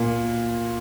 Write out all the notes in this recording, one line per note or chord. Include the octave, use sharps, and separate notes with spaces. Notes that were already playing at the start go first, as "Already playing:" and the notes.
Already playing: A#2 A#3